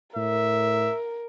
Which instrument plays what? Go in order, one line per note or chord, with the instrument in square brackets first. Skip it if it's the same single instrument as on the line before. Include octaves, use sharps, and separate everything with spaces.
[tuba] A2 [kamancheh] A#4 [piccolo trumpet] E5